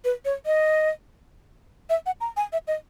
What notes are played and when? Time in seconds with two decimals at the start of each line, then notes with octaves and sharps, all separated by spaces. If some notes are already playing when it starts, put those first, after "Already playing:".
0.05 B4
0.25 C#5
0.46 D#5
1.90 E5
2.06 F#5
2.20 A#5
2.37 G#5
2.53 E5
2.67 D#5